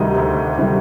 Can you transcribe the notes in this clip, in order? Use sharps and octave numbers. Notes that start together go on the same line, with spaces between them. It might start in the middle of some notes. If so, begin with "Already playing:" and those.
Already playing: D2 C3 D#3 G3 D#5
D2
C3 D#3 G3